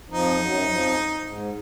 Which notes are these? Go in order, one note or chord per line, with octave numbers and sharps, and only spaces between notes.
F2 F3 D#4
F#2 F#3
F#3
F2 F3
G#2